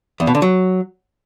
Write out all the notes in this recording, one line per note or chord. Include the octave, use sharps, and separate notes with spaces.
E2
B2
D3
F#3